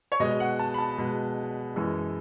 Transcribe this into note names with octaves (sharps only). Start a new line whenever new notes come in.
C#5
B2 G#3 D#5
F#5
A5
B5
A5
B2 G#3
F#2 E3 G#3